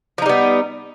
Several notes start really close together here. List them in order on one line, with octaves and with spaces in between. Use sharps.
F3 D#4 G3 B3